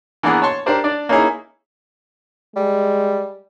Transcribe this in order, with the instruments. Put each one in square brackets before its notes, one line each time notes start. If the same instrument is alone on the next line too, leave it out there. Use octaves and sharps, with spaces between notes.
[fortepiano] E3 A#3 B3 D4 G#4 A#4
C#5 A5 C6 C#6
D4 G4 A#4 C5 D5
D4 D5
A#3 C#4 D#4 E4 G#4
[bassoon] G3 [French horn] G#3